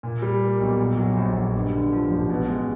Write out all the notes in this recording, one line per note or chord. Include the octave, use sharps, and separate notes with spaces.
A#2
G3
A#3
B1
A#2
F#3
A#1
A#1
G2
D3
F3
A1
B2
G#3